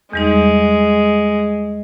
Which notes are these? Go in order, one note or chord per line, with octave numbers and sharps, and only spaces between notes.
E2 G3 G#3 D#4